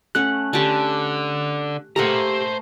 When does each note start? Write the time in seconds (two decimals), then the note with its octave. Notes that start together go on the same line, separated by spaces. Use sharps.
0.15 A3 C#4 F#5 F#6
0.53 D3 G4 A5
1.96 A3 A#3 G4 C5 F#5 A#5